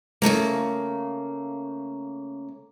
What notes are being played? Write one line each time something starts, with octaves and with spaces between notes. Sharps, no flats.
C#3 F3 A3 A#3